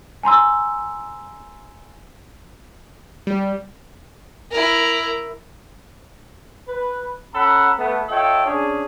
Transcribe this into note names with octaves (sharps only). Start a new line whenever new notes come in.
G#5 A#5 C6 E6
G3
E4 A#4
B4
C#4 A4 F#5 A#5 B5
A3 B3
F4 A4 C#5 D#5 E5 G5
C#4 D4 G#4